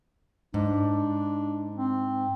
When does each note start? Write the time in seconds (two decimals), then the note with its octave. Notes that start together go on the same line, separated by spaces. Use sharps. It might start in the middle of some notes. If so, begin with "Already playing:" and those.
0.54 G#2 D4
1.76 C4